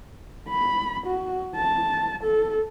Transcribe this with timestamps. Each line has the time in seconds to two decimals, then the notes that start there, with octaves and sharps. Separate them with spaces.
0.49 B5
1.07 F#4
1.56 A5
2.23 A4